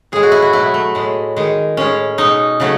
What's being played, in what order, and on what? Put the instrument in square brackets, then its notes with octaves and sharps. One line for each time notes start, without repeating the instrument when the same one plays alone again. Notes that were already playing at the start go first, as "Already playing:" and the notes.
[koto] A2 G#3 G#4
F#4
E4
F#4
B2 F#3 A3 E4
A3
A2 G#3
D#3 G#3
A2 G#3 C#4
B2 G#3 D#4
C#3 F#3 A3